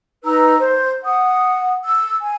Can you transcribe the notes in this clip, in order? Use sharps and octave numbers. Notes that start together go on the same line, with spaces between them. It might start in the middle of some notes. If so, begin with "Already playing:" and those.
D#4 B4 A#5 E6
C5
F#5 D#6
E6
G#5